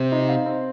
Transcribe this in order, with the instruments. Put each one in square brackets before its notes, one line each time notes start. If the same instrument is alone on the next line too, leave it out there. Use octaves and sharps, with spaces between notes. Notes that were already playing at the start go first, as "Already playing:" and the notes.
Already playing: [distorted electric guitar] C3 [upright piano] C4
[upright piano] D#4
F5
C4